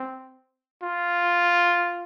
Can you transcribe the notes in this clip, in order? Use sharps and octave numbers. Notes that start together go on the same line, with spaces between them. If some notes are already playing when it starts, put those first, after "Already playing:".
Already playing: C4
F4